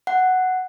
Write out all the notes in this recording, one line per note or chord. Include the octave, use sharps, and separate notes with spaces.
F#5